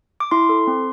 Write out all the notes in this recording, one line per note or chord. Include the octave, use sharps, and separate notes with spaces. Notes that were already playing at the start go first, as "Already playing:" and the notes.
D6
E4 C6
A4
C4